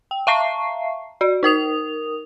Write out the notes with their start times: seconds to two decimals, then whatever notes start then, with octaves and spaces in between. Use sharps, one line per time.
0.11 G5
0.27 E5 F5 A5 A#5 C#6 C7
1.21 F#4 D5
1.43 D#4 A#4 D#6 F7